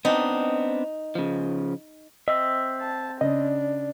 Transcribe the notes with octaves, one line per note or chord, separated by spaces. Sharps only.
B3 C4 D4 D#4
C#3 F3
C4 D#5 E5
A5
C#3 D4 D#5